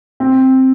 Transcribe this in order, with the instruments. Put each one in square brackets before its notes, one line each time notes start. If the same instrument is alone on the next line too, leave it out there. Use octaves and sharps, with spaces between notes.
[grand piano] C4